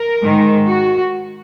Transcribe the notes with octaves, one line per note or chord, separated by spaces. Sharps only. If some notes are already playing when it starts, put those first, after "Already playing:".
Already playing: A#4
G#2 D#3 G#3
F#4